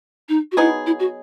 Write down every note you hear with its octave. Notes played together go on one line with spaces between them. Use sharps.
D#4
F#4
F#3 B3 D#4 E4 G#4
E4
F#4